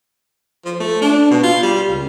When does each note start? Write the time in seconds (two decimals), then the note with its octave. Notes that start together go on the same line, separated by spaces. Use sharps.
0.65 F3
0.80 A3
1.02 D4
1.31 B2
1.44 F4
1.63 G3
1.89 C#2